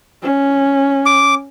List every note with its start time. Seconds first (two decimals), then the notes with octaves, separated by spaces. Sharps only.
0.23 C#4
1.06 D6